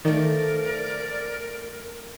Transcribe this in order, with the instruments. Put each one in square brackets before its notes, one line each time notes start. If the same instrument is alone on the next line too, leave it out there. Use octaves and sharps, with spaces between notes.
[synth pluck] D#3 [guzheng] F3 A3 [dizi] A#4 [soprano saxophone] D5